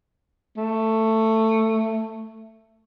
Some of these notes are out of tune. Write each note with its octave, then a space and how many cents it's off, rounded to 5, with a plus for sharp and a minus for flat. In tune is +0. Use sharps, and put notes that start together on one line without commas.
A3 +10